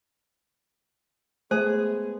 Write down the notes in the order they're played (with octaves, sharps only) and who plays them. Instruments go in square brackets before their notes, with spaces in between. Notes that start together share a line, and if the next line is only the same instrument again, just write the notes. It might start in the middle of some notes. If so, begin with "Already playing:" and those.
[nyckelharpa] G#3 B3 [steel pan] A3 [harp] G#4 [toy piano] C5